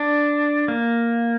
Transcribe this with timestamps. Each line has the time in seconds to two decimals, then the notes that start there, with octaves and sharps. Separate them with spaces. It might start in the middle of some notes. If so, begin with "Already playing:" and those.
Already playing: D4
0.68 A#3